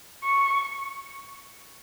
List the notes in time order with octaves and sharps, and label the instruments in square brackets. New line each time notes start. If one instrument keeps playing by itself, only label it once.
[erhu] C#6